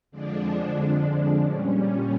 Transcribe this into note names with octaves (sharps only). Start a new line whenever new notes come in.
F2 D3 F3 G#3 D4
A#2 G3 C#4